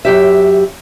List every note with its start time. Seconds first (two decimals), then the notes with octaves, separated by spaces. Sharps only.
0.05 F#2 B2 G4 E5